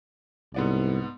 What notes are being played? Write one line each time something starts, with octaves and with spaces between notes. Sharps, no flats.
C2 G#2 B3 D5